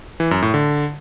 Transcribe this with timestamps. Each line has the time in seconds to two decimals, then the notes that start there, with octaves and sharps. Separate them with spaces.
0.20 E3
0.31 F#2
0.42 A2
0.54 D3